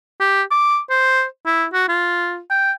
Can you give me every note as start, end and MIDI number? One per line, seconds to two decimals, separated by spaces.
0.20 0.42 67
0.51 0.79 86
0.90 1.24 72
1.46 1.66 64
1.73 1.85 66
1.88 2.39 65
2.50 2.72 79